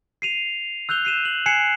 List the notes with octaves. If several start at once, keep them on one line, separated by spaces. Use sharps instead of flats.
C7 D#7 F7
E6 F#6 G6 F7 G7
C7 D#7 E7
F#7
G#5 F#6 G#6 C7 C#7 E7